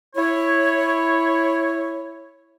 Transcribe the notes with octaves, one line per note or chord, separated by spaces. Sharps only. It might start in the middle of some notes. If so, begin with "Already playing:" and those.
E4 C#5